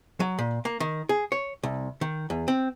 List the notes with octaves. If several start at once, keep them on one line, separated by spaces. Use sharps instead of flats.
F#3
A#2
A#3
D#3
G#4
C#5
C2
D#3
E2
C4